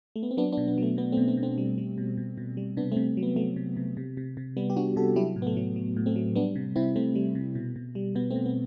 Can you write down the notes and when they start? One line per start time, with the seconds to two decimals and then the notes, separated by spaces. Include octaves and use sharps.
0.16 A3
0.23 B3
0.31 C4
0.37 F#3 B3 D4
0.52 B3 D4
0.57 B2
0.68 B3
0.78 F#3 A3
0.97 B2 B3
1.12 A3 C4
1.17 B2
1.28 A3 C4
1.37 B2
1.43 A3 C4
1.58 G3
1.78 G3
1.98 B2
2.17 B2
2.38 B2
2.57 G3
2.77 C3 B3 D4
2.92 A3 C4
2.96 C3
3.17 F#3
3.23 B3
3.36 F#3 A3
3.56 C3
3.77 C3
3.97 C3
4.17 C3
4.37 C3
4.57 G3 B3
4.70 G4
4.76 G3 D4 F#4
4.96 C3 F#4 A4
5.16 F#3 E4 G4
5.36 A2
5.42 B3
5.47 A3
5.57 F#3
5.76 F#3
5.97 A2
6.06 A3 C4
6.16 F#3
6.35 G3 B3 D4
6.56 C3
6.76 C3 C4 E4
6.96 C3 A3 C4
7.15 G3
7.35 C3
7.55 B2
7.76 B2
7.95 G3
8.15 B2 B3
8.30 A3 C4
8.36 B2
8.46 B3